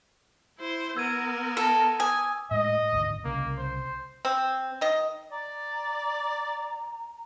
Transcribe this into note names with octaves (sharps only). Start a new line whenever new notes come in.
E4 C5
B3 A#4 E6 G#6 D#7
A4
G#5 D6 D#6
A2 G#3 D#5
G#1 D2
C2 C#3 A#3
C5
C4
D#3 D#5
D5 A#5